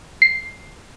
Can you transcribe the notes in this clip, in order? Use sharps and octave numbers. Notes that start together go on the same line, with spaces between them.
C7